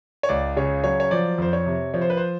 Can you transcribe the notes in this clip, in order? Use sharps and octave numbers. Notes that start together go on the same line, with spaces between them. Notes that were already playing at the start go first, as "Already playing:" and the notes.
C#5
C#2 D5
C#3 C#5
F#3 C#5
C#5
F3 D5
F2 C5
C#5
C3
F3 C#5
C5
B4
C5